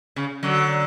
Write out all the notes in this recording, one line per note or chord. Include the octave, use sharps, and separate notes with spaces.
C#3
D3 F#3